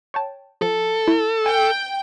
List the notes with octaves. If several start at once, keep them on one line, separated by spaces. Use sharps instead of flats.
C#5 G5 A5
F3 A4
E4
G5 G#5